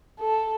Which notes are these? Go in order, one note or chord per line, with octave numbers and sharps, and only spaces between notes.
A4